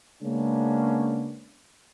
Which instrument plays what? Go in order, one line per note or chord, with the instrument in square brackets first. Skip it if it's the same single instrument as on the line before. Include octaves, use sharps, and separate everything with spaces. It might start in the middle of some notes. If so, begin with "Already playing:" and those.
[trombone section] C#3 G#3 A#3 B3 C#4 D4